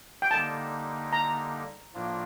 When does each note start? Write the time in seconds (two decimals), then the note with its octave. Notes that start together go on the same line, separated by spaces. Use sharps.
0.22 G5
0.31 D3 G3 A#3 D#4 A5
1.13 A#5
1.94 A2 F3 A#3 D4 F4